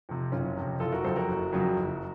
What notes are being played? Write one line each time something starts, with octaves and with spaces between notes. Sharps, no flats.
F2 C3
F#1 C#4 F4
F2 C3
F#1 F4 A4
F#4 A#4
F2 C#3 F#3 A4 C5
F#4 A#4
F#1
F2 C#3 F#3
F#1